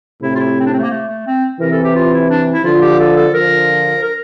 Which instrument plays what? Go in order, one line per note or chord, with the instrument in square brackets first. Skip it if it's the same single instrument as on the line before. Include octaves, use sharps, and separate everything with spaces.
[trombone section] A2 C3 [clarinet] E4
[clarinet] F4
E4
C4
D4
C4
A3
A#3
A3
A3
C4
[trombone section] C3 E3 [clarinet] A#4
[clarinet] A4
G4
F4
E4
D4
E4
[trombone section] D3 F3 [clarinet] F4
[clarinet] G4
A4
A4
[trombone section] D3 F3 [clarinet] A#4
[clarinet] A#4